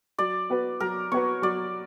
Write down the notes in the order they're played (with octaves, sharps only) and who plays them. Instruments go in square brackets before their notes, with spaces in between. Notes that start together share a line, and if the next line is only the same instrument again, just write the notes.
[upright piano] F#3 [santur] D5
[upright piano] B3 F#4 B4
[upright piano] F#3 [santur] A#4
[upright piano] B3 F#4 B4 [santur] C#5
[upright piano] F#3 [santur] D5